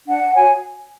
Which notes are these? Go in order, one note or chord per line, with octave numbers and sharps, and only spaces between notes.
D4 F#5
F#4 C#5 G#5